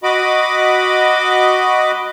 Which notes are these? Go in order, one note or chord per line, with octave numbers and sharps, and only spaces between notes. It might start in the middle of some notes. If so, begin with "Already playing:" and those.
F#4 D#5 B5 D6